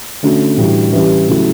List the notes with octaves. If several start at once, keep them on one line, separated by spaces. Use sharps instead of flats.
D3 A3 C#4 F#4
A2 E3 G3 D4 F#4
E3 G3 C#4 G4
C#3 F#3 A3 E4 G4